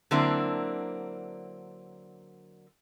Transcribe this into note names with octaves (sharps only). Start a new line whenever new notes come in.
D3 F#3 A#3 C4 D4 E4